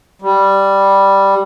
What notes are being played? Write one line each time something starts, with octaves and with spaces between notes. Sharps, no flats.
G3